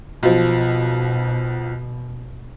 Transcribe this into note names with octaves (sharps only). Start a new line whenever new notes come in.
B1 B2 F3